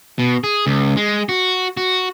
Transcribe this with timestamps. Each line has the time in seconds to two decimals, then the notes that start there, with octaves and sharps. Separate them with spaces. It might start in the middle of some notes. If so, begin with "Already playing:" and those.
0.19 B2
0.44 G#4
0.67 C#2
0.97 G#3
1.29 F#4
1.77 F#4